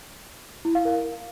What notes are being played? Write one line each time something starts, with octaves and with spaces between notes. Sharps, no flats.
E4
F5
A#4